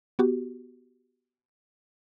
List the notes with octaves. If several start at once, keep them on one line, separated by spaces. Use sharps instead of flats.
B3 F#4 G4